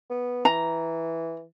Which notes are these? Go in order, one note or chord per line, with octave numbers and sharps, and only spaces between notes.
B3
E3 A#5